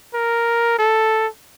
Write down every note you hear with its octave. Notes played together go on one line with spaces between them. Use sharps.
A#4
A4